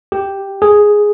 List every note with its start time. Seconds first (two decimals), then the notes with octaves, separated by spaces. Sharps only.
0.12 G4
0.62 G#4